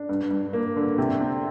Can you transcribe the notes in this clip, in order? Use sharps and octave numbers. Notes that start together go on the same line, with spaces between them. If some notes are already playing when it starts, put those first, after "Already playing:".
Already playing: D4
G2
G2
A#3
D3
C3
C4